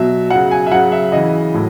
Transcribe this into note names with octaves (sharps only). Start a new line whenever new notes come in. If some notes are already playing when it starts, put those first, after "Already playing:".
Already playing: B2 F#3 E5
C#3 F#3 F#5
G#5
E5
C#3 F#3 F#5
E5
C#3 E3 D#5
A2 F#3